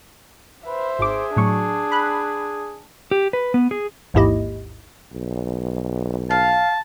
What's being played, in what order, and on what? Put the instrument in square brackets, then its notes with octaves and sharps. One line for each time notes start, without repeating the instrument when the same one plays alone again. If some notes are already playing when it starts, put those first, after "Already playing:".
[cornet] B4 [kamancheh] C5 E5
[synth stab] G#1 D6 [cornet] G#4
[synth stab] A2 F#3 C#6 [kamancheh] D4
[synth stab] B5 F#6
[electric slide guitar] G4
B4
B3
G#4
[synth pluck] A1 D#2 G#2 E4 G4 D#5
[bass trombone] B1
[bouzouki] F5 [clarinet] A5